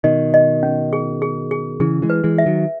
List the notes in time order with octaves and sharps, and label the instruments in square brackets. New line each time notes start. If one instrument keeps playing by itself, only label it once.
[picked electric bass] B2 D#3 [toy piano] D#5
[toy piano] D#5
C#4
G#4
G#4
G#4
[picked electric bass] C#3 E3 [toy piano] G#4
[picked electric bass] E3 G#3
[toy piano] B4
[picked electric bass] E3 G#3
[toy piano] E5
[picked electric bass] D#3 F#3